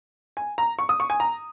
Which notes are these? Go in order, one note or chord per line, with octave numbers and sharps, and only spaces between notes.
G#5
A#5
C#6
D#6
C#6
G#5
A#5